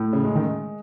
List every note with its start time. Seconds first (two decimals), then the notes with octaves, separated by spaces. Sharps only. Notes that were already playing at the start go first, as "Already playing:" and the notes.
Already playing: A2
0.13 C#3
0.24 G#3
0.35 D#3